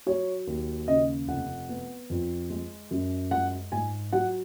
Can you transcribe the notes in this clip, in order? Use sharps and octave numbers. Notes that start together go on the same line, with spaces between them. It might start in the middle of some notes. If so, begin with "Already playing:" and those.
F#3 C#5
D#2
C#3 D#5
F1 F#5
B3
F2
G#3
F#2
G#3 F#5
G#2 G#5
F#3 F#5